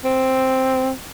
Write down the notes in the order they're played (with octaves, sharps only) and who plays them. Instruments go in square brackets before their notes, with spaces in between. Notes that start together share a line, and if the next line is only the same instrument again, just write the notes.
[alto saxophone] C4